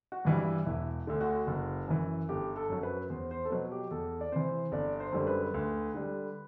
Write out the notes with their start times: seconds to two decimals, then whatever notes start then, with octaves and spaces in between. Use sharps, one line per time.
0.12 F#4
0.25 G2 E3 G3
0.39 E4
0.66 E1 E4
1.07 D2 D3
1.21 F#4
1.47 F#1
1.88 F#2 E3
2.29 G1 G4
2.56 A4
2.70 F#2 F#3
2.83 B4
3.10 E2 C5
3.31 C5
3.45 A4
3.50 B2 F#3 B4
3.71 G4
3.91 E2 A4
4.21 D5
4.32 C3 E3 C5
4.72 G1 D5
5.00 C5
5.12 F#2 D3 G3
5.27 B4
5.54 D2
5.95 D3 G3